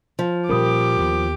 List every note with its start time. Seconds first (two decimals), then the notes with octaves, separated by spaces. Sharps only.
0.19 F3
0.49 A#2 G3 C#4 G4 A#4 B5 D6 D#6
0.99 D#2 B3